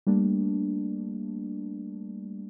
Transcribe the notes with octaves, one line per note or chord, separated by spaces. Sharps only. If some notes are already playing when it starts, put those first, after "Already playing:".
G3 A3 A#3 D4